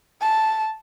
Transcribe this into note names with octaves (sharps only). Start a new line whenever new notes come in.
A5